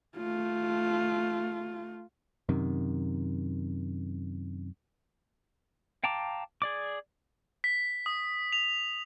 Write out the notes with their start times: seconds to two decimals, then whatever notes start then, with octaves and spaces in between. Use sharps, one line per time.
0.17 A3 F4
2.49 F#2 C3 D#3
6.04 F5 G5 A5 A#5 D6
6.62 G#4 D5 D6
7.64 B6
8.06 D#6
8.53 F7